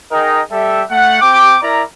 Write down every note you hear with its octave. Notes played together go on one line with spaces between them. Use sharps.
D#4 G#4 A#4 D#5 G5
G3 G4 A4 E5
A3 F#5
C4 G5 D6
E4 A#4 D5 A#5